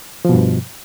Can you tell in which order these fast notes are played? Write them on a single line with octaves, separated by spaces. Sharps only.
F3 B2 G2